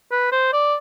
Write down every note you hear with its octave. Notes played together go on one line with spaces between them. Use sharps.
B4
C5
D5